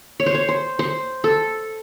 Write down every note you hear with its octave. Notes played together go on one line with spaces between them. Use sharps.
C#5
C5
C#5
C5
C5
A4